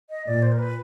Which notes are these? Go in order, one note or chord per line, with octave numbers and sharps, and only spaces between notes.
D#5
A#2 D5
C5
A#4
B4